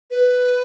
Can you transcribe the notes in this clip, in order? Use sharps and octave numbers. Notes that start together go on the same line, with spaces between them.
B4